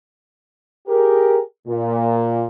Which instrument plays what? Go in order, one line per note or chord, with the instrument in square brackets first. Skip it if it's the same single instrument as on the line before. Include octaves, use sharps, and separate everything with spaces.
[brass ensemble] G4 G#4 A#4
A#2